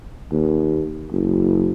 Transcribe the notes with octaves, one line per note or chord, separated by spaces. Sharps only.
D#2
F#1